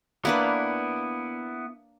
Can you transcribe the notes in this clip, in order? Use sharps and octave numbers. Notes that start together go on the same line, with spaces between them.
A#3 B3 D4 E4 B4